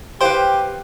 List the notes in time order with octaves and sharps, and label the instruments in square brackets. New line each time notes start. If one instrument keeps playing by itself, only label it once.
[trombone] G4 [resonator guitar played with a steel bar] B4 F5 G5 [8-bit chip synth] C5 C6